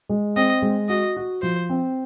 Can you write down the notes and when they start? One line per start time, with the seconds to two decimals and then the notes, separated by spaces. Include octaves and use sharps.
0.09 G#3
0.36 C4 D#5
0.62 G#3
0.89 F#4 D#5
1.16 F#4
1.42 F3 C5
1.69 C4